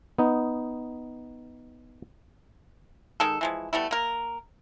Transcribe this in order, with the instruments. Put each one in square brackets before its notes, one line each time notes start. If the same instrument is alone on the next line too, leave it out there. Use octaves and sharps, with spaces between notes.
[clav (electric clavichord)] B3 D#4
[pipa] D#3 G#3 A4
E3 F3 G#3
G3 A3 B3 E4
A#3 A#4